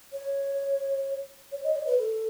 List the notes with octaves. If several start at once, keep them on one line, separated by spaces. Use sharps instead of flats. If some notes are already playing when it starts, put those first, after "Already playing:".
C#5
C#5
D#5
C#5
B4
A4